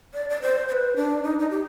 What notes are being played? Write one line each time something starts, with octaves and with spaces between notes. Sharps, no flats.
D5
D5
C5
C5
B4
D4
D#4
D#4
G4